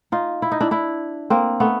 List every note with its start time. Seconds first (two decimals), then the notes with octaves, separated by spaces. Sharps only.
0.12 D#4 F4
0.42 E4
0.52 D#4
0.61 D4 E4
0.71 D4 E4
1.30 A#3 C4
1.60 A3 B3